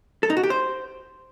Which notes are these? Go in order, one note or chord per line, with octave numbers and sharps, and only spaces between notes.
A4
D#4
F#4
G4
C5